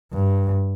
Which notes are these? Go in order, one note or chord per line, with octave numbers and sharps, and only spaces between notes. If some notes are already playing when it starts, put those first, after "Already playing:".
G2